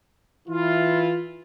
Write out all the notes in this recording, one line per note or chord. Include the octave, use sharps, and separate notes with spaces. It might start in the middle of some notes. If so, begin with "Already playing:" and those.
E3 E4 F4